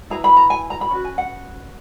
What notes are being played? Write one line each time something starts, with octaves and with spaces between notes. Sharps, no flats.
E4 G#4 B4 A#5
B5
A#5
G#5
A#5
B5
C#4 F#4 B4
G#5
F#5